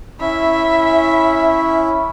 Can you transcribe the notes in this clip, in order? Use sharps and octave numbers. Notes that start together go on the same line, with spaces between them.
C#4 E4 E5